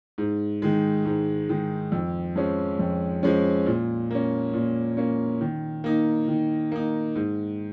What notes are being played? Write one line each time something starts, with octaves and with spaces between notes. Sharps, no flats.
G#2
D#3 G#3
G#2
D#3 G#3
F2
F3 G#3 C#4
F2
F3 G#3 C#4
A#2
A#3 C#4
A#2
A#3 C#4
D#3
A#3 D#4
D#3
A#3 D#4
G#2